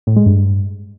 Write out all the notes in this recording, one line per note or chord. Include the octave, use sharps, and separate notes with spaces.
A2
G#3
G2